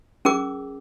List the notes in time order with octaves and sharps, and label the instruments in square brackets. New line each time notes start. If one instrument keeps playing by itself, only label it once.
[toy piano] C#4 G#4 A#4 D6